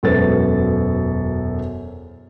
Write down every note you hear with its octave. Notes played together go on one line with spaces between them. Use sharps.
E1 F#2 A4 B4 C5 A6